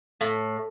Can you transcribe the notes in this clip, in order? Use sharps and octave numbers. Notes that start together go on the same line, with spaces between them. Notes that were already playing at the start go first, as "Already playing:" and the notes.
A2